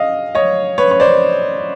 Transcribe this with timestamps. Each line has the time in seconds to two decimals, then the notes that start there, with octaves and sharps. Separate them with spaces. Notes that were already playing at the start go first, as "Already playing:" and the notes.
Already playing: D#5 F5
0.35 C#5 D#5
0.78 B4 C#5
0.91 C#5
1.00 C5 D5